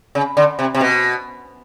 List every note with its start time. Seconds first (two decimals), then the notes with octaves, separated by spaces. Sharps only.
0.15 C#3
0.37 D3
0.59 C3
0.75 C3
0.81 B2